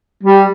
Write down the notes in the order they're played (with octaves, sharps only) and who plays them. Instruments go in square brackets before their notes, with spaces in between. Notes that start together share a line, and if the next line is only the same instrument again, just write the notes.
[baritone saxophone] G3